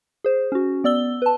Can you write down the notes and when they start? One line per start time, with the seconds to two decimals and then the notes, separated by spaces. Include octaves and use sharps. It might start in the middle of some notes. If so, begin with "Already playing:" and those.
0.24 G#4 C5
0.52 C#4 F#4
0.84 B3 D5 E6 G7
1.22 B4 A5